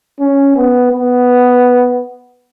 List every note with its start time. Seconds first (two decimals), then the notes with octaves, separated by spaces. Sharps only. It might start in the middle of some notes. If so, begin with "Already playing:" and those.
0.20 C#4
0.56 B3
0.92 B3